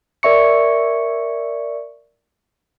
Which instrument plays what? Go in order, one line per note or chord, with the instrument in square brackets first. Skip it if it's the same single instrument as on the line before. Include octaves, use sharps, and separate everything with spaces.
[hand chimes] A#4 D5 E5 C#6 C#7